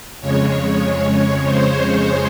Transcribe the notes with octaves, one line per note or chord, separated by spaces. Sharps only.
F2 C#3 G#3 C#5
C#5
C5